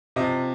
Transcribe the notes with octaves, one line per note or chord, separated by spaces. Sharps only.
C3 F3 D#5